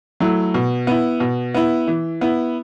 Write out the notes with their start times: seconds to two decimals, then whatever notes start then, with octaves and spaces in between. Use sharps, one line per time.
0.20 F#3 A3 E4
0.54 B2
0.87 B3 E4
1.20 B2
1.54 B3 E4
1.87 E3
2.21 B3 E4